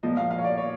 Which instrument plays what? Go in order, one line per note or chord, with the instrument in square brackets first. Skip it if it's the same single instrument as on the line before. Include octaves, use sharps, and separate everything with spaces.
[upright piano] A#2 F3 D#5
F5
F5
C#5
D5
C#5